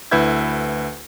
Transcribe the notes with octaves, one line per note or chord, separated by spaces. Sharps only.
D2 E4 B4 E5 G6 G#6